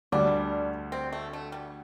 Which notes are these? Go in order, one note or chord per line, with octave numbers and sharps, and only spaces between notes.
D2 D3 G3 D4
C4
A3
A3
G3